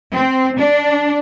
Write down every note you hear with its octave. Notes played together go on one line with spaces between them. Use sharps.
C4
D4